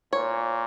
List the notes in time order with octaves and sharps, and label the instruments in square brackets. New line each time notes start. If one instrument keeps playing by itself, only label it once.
[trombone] A#2 [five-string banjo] C#5